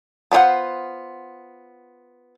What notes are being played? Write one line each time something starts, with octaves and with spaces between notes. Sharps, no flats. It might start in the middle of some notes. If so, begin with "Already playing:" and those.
B3 D4 F4 C5 F#5